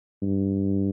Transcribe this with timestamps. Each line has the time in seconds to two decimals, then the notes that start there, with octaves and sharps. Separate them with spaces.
0.23 G2